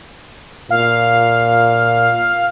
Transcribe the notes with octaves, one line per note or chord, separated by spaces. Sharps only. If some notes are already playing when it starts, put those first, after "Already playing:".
A#2 F5